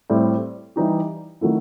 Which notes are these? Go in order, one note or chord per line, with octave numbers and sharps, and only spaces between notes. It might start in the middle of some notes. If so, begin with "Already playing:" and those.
A2 G3 C4
E3 G3 D#4 G4
D#3 F#3 A3 E4